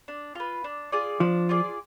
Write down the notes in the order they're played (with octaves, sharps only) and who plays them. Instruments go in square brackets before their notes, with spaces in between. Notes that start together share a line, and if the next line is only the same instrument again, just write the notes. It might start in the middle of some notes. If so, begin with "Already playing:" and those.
[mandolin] D4
F4 B4
D4
F4 G#4 D5
[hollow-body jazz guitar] F3 [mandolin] D4
[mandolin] F4 G#4 D5